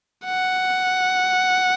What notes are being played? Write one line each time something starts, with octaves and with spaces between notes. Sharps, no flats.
F#5